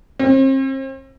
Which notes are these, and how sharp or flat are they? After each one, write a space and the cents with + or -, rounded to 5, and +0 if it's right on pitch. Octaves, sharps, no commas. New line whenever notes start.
C4 +40